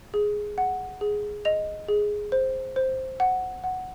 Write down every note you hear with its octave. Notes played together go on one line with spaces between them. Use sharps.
G#4
F#5
G#4
D#5 F7
G#4
C5
C5
F#5
F#5